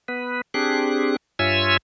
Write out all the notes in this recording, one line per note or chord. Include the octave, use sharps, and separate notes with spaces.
B3 B4
C4 D4 G4 G#4 F#6
G2 F4 C#5 E5 G#5 E6